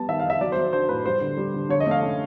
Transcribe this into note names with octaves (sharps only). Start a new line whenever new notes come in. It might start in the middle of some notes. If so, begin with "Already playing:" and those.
Already playing: G3 B3 A5
D#3 E5
F5
D#4 E5
F#3 D5
C5
F#3
D4 C5
A2 B4
G3 C5
D3
G3
D3
D3 C#5
D#5
A3 F5
C#4